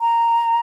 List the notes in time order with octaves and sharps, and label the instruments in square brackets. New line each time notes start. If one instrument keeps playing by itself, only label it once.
[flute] A#5